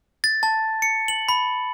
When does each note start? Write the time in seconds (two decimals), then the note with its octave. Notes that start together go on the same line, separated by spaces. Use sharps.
0.24 A6
0.43 A5
0.82 C#7
1.08 F#7
1.29 B5